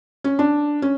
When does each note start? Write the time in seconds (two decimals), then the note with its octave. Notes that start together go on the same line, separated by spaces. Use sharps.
0.24 C#4
0.39 D4
0.82 C#4